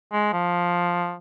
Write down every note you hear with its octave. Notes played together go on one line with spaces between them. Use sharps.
G#3
F3